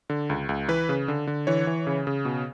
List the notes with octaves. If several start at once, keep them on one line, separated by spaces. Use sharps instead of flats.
D3
C#2
C#2
E3 B4
C#3
D3
D3
E3 C#5
E3
C#3
C#3
B2